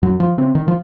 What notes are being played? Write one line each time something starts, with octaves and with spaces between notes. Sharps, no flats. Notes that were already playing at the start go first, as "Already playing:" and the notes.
F#2 F#3
F3
C#3 C4
D#3
F3